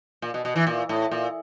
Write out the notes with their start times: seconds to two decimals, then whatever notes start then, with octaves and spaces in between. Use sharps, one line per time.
0.22 A#2
0.34 B2
0.45 B2
0.56 E3
0.67 A#2
0.89 A2
1.11 A#2